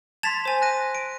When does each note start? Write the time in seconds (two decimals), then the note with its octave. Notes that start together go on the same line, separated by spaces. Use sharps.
0.23 A5 C6 G#6 A6 B6 F7
0.45 C5 G#5
0.62 F#6 A#6 D#7
0.95 D7